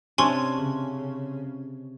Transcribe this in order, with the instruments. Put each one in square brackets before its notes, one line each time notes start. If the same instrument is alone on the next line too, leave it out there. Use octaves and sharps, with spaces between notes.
[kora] C3 C#4 D4 [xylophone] G#5 C6 C#6
[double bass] C#3